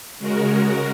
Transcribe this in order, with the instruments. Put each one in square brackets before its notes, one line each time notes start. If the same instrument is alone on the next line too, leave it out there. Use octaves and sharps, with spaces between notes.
[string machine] C#3 G#3 F#4 A#4